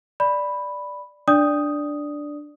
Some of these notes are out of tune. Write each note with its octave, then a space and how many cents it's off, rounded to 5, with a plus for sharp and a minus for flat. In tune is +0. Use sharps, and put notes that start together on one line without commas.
D5 +0 B5 +0
D4 +0 D5 +0 D#6 +0